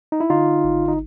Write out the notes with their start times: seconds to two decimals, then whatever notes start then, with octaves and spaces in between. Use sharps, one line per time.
0.12 D#4
0.20 E4
0.30 D3 D#4 F4
0.64 G#1
0.88 D#4